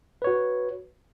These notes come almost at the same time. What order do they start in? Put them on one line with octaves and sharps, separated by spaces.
B4 C#5 F#4